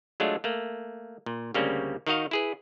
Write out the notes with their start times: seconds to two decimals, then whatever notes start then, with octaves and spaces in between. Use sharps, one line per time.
0.20 F#3 G#3 A3 D4 F4
0.44 A3 A#3
1.26 A#2
1.54 D2 C#3 G3 A#3 C4 C#4
2.07 D#3 D#4 F#4 D#5 F5
2.31 E4 G#4 B4